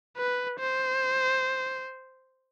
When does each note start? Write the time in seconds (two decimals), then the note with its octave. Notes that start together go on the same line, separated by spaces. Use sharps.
0.17 B4
0.60 C5